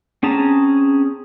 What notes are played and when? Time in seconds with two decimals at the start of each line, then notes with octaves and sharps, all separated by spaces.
0.23 C4 C#4 G#4 A5 A#5